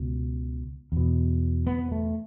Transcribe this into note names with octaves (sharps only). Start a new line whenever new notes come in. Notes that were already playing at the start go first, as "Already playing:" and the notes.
Already playing: C#2 B2
E2 B2
B3
A3